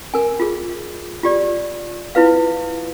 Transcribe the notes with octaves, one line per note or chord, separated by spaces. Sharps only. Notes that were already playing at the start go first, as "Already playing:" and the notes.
A#4 G#5
F4 G#4
F4 G4 D5
E4 F4 B4 F5